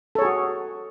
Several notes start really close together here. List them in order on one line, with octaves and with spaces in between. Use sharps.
A4 C#5 G#4 F#4